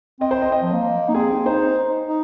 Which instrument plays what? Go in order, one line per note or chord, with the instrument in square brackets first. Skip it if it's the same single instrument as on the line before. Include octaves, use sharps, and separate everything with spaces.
[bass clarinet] C4 [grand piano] D#5
[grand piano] C5
D#5
D#5
[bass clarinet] F3
A#3
D#4
[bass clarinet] C4 [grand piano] G#4
[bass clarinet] D#4 [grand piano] C5
[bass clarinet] D#4